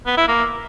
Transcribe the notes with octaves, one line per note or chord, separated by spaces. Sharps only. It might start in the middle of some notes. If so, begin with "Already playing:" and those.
B3
E4
A#3